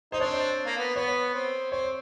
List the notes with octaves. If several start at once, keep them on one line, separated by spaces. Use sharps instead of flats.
D#4 C5
C4 D4 C#5
A#3
B3
B3 C#5
C4
C4 C#5